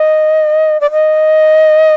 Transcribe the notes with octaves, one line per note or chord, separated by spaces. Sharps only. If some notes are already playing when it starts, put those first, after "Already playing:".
Already playing: D#5
D5
D#5